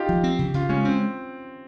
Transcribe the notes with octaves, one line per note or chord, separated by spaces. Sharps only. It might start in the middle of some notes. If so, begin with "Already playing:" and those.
Already playing: D#4 F4 G4
F3
C4
C#3
C#3 F4
G#3 C#4
C4 C#4